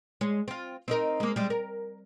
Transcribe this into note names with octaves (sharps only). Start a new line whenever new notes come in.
G#3 C#5
C4 F4
C4 D#4 A#4
G#3 A#3
G3 G#3
A#4